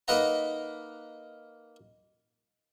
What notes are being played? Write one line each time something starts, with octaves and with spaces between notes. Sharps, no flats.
A#3 D#4 B4 D#5 F#5 A#5